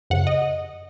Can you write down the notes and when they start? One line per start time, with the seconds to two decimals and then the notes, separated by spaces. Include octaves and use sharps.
0.10 F#2 C#3 F#5
0.27 D#5